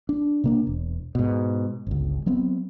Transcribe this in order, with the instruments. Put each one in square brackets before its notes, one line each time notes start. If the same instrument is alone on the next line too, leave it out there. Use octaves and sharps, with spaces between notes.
[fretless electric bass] D4
C3 A#3 D4
E1
G#2 B2
G1 C#2
F#3 B3 C4